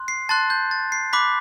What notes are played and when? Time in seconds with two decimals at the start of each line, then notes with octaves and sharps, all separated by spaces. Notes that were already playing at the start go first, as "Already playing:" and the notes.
Already playing: C6 F#6
0.08 C7
0.29 A5 C6 F#6 A6
0.50 G6
0.71 A6
0.92 C7
1.13 B5 D6 F#6 B6